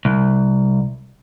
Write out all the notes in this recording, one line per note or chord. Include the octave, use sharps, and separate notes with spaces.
C2